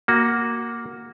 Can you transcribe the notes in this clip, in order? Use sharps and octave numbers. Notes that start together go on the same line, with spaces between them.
A#3 F#4